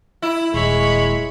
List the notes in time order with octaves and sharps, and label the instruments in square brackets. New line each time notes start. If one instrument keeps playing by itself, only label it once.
[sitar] E4
[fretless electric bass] D#1 [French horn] G#3 [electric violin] C#5 B5